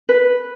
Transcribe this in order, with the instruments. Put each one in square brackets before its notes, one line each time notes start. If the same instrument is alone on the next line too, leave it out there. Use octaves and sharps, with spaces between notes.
[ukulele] B4